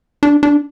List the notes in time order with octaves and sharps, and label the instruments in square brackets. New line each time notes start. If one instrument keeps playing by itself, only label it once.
[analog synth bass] D4
D4